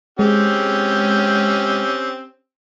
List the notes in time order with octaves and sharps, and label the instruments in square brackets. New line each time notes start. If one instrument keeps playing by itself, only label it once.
[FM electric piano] G#3 [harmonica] C4 C#4 G4